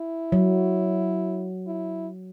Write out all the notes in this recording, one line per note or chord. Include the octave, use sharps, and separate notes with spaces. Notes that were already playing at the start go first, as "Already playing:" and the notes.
Already playing: E4
F#3
E4